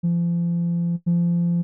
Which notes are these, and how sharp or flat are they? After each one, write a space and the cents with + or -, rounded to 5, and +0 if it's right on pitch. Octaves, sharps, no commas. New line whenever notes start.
F3 -35
F3 -25